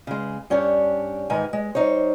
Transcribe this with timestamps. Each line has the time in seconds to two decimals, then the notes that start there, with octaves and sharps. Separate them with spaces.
0.07 C#3 G#3
0.50 G2 C#4 D4 G4 C#5
1.30 G#2 D#3 E3 G#5
1.53 G#3
1.75 G3 D#4 C5 C#5